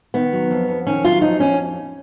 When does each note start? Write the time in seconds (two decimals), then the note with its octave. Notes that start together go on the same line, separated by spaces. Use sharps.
0.14 D#3 B3
0.33 F#3
0.51 F2
0.68 F2
0.86 D#3 C#4
1.04 F#3 F4
1.21 F2 D#4
1.40 F2 C#4